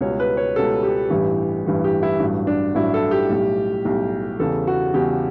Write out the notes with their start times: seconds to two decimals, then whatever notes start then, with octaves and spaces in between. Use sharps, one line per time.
0.01 C#2 B2 G3 C#5
0.20 B4
0.37 C#5
0.56 C#2 B2 G3 A4
0.83 G4
1.10 A1 G2 E3 G3
1.66 A1 G2 E3 G3
1.84 G4
2.03 E4
2.20 A1 G2 F#3
2.47 D4
2.75 A1 G2 F#3 E4
2.94 A4
3.11 G4
3.30 B1 A2 G3
3.85 B1 A2 G3
4.40 E2 C#3 G3 A4
4.67 F#4
4.94 E2 C#3 G3 G4